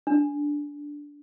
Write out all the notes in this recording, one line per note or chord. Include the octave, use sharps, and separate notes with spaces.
D4